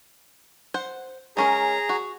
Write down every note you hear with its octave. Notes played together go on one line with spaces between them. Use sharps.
C5 F#5
G#3 C#4 G#4 A#4 A#5
F#4